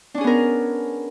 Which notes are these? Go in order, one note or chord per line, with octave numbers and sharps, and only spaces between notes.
B3 C#4 D4 G#4 A#4